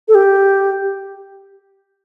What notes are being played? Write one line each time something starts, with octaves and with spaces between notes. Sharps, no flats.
A4
G4